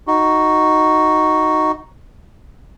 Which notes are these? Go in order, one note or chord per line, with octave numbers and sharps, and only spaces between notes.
D#4 F#4